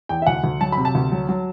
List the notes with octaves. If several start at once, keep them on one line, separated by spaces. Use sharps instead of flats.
E2 G5
E5
D2 F#5
D2
F#3 A5
B5
C3
A5
D2
F#3
F#3